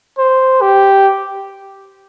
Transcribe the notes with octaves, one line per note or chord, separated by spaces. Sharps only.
C5
G4